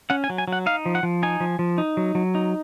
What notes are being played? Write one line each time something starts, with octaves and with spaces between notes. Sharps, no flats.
C#4 F#5
G#5
F#3
G#5
F#3 F#5
D#4 F5
F3
F#5
F3
D#4 G#5
F3
F3
D#4
F#3
F#3
D#4